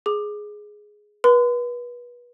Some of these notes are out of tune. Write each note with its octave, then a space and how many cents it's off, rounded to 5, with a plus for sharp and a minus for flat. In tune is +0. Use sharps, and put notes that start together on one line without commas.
G#4 +5 D6 +20
B4 -30 C6 -45